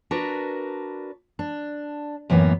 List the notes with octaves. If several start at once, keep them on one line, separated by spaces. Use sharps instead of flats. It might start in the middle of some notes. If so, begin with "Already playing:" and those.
D4 F#4 A#4 B4
D4
F#2 A2 E3 A#3 B3